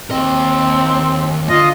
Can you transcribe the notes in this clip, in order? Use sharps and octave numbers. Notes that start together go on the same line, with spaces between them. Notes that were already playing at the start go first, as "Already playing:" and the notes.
D#2 C4 D#5
D3 F4 D#5